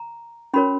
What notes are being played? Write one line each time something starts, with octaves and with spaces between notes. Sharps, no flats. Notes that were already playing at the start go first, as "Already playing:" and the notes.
Already playing: A#5
C#4 F#4 A#4 C#5 B5